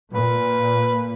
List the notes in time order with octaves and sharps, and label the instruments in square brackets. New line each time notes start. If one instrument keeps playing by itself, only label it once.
[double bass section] A#2 [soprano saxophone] B4